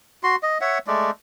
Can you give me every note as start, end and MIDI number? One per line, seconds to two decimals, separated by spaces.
0.23 0.36 66
0.23 0.36 84
0.43 0.58 75
0.61 0.78 73
0.61 0.78 76
0.61 0.78 78
0.87 1.11 56
0.87 1.11 57
0.87 1.11 74